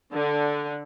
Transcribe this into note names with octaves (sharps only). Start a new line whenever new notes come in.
D3